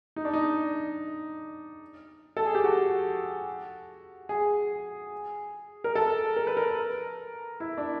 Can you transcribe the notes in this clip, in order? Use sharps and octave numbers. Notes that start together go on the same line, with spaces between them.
D#4
D4
D#4
A4
G#4
G4
F#4
G#4
A#4
A4
A#4
B4
A#4
E4
D4